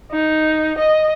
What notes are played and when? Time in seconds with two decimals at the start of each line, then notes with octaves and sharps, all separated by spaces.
0.11 D#4
0.78 D#5